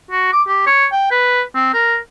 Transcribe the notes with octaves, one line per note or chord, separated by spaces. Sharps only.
F#4
D6
G4
C#5
G5
B4
C4
A#4